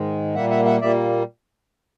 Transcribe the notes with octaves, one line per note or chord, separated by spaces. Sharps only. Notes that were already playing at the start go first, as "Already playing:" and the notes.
Already playing: G#2 D#3 G#3
A#2 G3 A#3 E5 F#5
E5 F#5
E5 F#5
A#2 G3 A#3 D5 E5